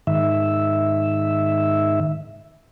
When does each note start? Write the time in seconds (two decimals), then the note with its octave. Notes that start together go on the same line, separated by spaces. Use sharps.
0.07 G#2 D#3 E5